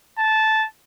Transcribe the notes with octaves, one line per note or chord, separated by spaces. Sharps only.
A5